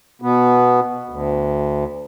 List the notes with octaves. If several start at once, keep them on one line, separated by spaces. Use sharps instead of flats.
B2 B3
D2